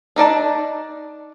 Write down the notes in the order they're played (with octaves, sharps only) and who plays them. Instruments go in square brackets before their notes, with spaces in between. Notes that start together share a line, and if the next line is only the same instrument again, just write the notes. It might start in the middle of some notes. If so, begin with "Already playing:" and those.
[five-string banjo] D4 D#4 D5 A5